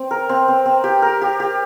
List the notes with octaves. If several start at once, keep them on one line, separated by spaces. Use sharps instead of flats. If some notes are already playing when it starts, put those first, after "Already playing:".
Already playing: C4
A#4
C4
C4
C4
G4
A#4
G4
G4